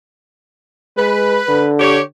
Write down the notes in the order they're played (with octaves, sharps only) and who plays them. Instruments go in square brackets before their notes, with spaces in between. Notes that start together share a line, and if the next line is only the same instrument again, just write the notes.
[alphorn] G#3 [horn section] B4
[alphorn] D3
[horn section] G4 C#5